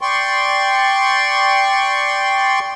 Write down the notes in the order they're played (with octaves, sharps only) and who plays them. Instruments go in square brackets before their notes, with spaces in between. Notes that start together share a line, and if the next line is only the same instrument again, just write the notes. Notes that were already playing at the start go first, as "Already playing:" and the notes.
[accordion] D5 G5 C6 C#6